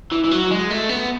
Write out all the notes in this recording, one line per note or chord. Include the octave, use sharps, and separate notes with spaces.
E3
E3
F#3
G#3
A3
B3